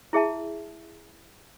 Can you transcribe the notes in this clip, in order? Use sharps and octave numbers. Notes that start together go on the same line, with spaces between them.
E4 G#4 E5 A5